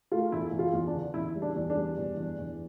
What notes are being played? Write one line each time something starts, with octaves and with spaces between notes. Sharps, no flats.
A3 F4
E2 E4
E2
F4
E2
D4
D3
E2 E4
G3
D4
E2
D4
G3
E2
E2
E2